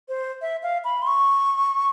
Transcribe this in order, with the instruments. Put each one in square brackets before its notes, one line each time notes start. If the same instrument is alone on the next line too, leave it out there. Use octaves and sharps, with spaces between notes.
[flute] C5
E5
F5
B5
C6
C#6